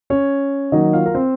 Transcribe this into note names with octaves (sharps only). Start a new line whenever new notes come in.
C#4 C#5
D#3 F#3 A#3 D#4 D#5
F4 F5
A#4
C4 C5